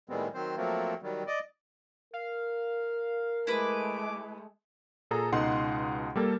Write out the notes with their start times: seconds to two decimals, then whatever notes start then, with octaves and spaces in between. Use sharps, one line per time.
0.09 A2 D#3 G3 G#3 B3 C4
0.34 D#3 F#3 C4 C5
0.56 F3 F#3 A3 A#3 C4
1.02 D#3 F#3 G3
1.27 D5 D#5
2.13 A#4 F5
3.47 G#3 A3 E4 B4 D6
5.11 A#2 G#4 A4 A#5
5.32 C#2 B2 D#4 F#5 C6
6.16 G3 A#3 A4